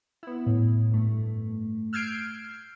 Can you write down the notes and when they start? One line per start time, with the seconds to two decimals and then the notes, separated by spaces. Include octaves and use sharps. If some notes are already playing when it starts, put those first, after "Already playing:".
0.23 B3 E4
0.46 A2
0.92 G2 A3
1.93 E6 F6 G6 G#6 C7 D7